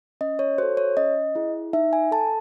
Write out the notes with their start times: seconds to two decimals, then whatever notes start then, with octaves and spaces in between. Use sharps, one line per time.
0.21 C#4 D#5
0.39 C#5
0.58 F#4 A4 C5
0.77 C#5
0.97 C#4 D#5
1.35 E4 G#4
1.73 D#4 E5
1.93 G#5
2.11 A4 A5